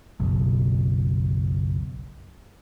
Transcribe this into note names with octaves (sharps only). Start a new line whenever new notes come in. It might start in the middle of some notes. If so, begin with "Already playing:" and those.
F#1 B1